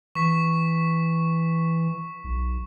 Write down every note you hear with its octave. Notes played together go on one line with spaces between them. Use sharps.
E3 C#6 B6
B1